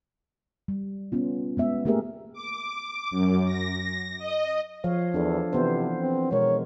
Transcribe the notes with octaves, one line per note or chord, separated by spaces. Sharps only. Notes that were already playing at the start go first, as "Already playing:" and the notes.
G3
B3 C#4 F4
G#3 B3 E5
A3 A#3 G4 G#4 A#4 E5
D6
F#2
A#6
D#5
F3 C#5 F5
E2 D4 A4
C3 E3 B3 C5
C4
B2 G#3 A#4 C#5